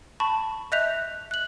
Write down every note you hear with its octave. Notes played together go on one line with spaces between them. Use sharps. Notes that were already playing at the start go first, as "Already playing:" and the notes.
A5 B5 C#6
D#5 E5 F#6 G6 B6 F7
F#6 F#7